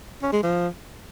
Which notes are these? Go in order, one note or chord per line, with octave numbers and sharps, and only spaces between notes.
C#4
G#3
F3